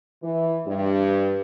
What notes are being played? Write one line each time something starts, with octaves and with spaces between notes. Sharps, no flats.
E3
G2